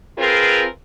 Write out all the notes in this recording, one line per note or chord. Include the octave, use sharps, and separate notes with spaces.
C4 F4 G#4 A#4 B4